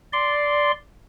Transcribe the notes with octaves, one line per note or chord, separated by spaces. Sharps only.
D5 C6